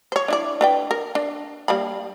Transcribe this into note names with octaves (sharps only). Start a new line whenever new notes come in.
C5 C#5
D4 E4 D5
D4 B4 G5
A#4
D4
G3 A#3 B5